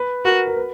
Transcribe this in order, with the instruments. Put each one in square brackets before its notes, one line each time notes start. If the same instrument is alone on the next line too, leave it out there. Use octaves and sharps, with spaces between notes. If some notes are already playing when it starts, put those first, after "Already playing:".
Already playing: [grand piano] B4
[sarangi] F#4 [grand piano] A#4
[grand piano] A#4
B4